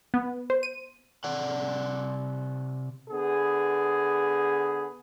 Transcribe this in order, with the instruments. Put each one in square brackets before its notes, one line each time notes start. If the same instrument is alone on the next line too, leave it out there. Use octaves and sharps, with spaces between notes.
[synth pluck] B3
C5
D#7
[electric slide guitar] C3 D5 F#5
[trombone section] D3 B3 G#4